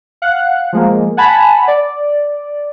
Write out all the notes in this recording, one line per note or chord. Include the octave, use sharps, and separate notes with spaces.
F5 F#5 F#6
F3 G#3 A#3
F#5 G#5 A5 B5
D5